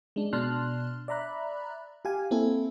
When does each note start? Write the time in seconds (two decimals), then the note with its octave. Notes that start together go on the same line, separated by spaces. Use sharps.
0.16 G#3 D4
0.33 B2 D4 A5 C6 F6 F#6
1.08 D5 E5 A#5 B5 F#6
2.05 G4 F5 G#5
2.31 A#3 C4 E4 A4